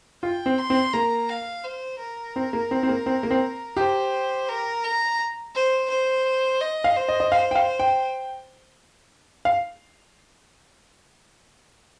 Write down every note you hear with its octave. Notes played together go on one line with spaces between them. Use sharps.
F4 G5
C4
C6
C4
A#3 A#5
F5
C5
A#4
C4
A#3
C4
C4
A#3
C4
A#3
C4
G4 C5
A#4
A#5
C5
C5
D#5
F5
C5
D#5
D#5
C5 F5
G5
F5
G5
F5